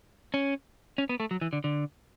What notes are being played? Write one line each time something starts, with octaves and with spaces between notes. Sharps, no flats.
C#4
C#4
B3
A3
F#3
E3
D3
D3